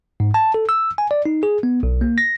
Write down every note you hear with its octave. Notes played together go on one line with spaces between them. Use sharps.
G#2
A5
A4
E6
G#5
D5
D#4
G#4
B3
B1
A#3
A#6